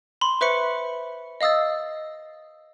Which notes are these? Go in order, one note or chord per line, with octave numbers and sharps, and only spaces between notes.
B5 C6
B4 C5 E5 B5 C#6 C#7
D#5 F5 D#6 E6 A6